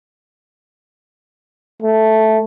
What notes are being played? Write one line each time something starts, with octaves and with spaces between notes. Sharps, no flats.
A3